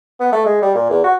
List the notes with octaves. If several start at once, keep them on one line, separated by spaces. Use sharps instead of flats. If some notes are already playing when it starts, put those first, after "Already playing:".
B3
A3
G#3
G3
A#2
E2
F#4